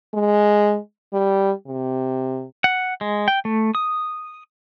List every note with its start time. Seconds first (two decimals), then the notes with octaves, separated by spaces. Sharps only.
0.14 G#3
1.13 G3
1.67 C3
2.64 F#5
3.01 G#3
3.28 G5
3.45 A3
3.75 D#6